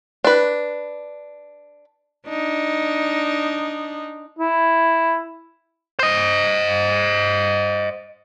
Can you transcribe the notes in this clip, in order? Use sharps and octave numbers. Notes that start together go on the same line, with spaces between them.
D4 B4
D4 D#4
E4
C5 D#5